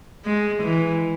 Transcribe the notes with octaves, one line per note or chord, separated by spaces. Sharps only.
G#3
E3